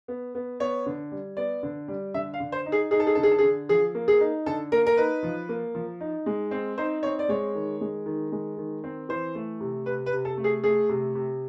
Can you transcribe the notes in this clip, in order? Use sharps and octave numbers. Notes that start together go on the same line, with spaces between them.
B3
B3
B3 C#5
D3
G3
B3 D5
D3
G3
D3 E5
F5
D3
C5
D#4
G#4
D#4 G#4
A4
G#4
D3 A4
G#4
A4
G#4
D3
F3 G#4
A#3
G#4
D#4
D3 A4
A#3 A#4
A#4
D#4 B4
F3
A#3
F3
D#4
G#3
C4
D#4 C5
C4 C#5
D5
G#3 C#5
D#3
G#3
D#3
G#3
D#3
C4
E3 C5
A3
C3
C3 B4
B4
C3
A4
A3
G#4
A3 G#4
C3
C3